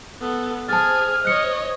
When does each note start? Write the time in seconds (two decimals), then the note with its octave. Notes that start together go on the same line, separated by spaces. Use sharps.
0.21 B3 A4
0.69 G#4 C5 G#5 A5 F6 A6
1.25 C#5 D#5 F#6 C#7